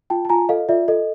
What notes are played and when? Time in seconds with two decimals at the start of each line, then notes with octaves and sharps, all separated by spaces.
0.10 F4 G5 A5
0.25 A5
0.29 F4 G#5 A#5
0.49 A4 D#5 F5
0.69 F4 D5 E5
0.88 A4 D#5